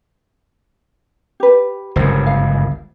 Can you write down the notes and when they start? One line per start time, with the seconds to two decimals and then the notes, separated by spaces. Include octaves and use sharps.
1.40 G4 B4
1.96 G1 C#2 F#2 A#4 C5
2.26 F5